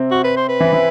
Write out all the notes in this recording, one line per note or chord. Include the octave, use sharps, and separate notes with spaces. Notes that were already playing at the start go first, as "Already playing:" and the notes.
Already playing: C3 C4
F#4
B4
C5
B4
E3 E4
E3 E4